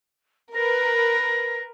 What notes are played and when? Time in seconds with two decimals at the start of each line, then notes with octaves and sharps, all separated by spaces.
0.55 A#4 B4 A#6